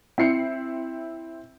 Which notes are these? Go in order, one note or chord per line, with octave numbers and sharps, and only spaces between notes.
C4 E4 C7 C#7